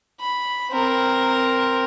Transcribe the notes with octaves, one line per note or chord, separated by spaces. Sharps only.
B5
C4 A#4